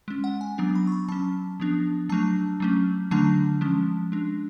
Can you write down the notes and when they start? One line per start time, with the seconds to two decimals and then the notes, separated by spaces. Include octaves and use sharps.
0.08 G#3 C#4
0.24 F#5
0.41 G#5
0.58 F#3 B3 D4
0.75 B5
0.87 C#6
0.92 B5
1.09 F#3 C#4 A5
1.60 F3 B3 D4
2.09 F#3 A3 D4 A5
2.60 F#3 A3 C#4
3.11 D3 F#3 A3 D4 A5
3.61 F3 G#3 C#4
4.12 G#3 D4